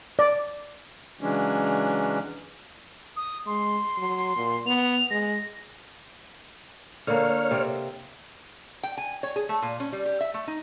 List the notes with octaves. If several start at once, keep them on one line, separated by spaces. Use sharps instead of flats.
D5
C#3 E3 F#3 G#3 C#4 D4
D#6
G#3 C6
F#3
A#2
B3 F7
G#3 A#6
D3 A#3 C#5 F6
C3 C4
G5
G#5
C#5
G#4
A3
A#2
C#4
G3
G4
E5
A3
D#4